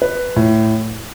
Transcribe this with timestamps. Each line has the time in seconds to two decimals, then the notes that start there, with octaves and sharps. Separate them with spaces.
0.02 B4
0.36 A2